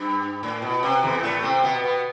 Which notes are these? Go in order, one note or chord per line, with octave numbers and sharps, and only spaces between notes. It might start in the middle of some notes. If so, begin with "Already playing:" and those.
Already playing: G2
A2
B2
C3
E2 E3
A2 A3
C3 C4
B2 B3
B2 B3